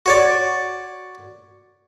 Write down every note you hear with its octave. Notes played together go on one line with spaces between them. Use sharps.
F#4 C#5 D5